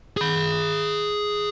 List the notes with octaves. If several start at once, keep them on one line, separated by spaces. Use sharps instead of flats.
G#4 B5